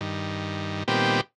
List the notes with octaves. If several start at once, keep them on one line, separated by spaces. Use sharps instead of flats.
G2 D#3
A#2 D#3 G3 B3 C4 G4